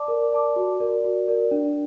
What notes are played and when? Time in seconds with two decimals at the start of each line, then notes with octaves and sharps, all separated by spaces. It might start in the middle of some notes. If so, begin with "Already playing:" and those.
Already playing: D5 A5 D6
0.08 A#4
0.32 D5 A5 D6
0.56 F#4
0.80 A#4 D5
1.04 F#4
1.28 A#4 D5
1.51 D4